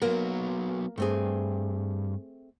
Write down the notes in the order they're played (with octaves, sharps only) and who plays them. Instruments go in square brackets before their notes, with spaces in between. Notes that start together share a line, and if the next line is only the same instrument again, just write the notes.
[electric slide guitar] F#3 B3 [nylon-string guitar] A#3 A#4
[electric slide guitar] G2 [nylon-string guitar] A3 C4 G#4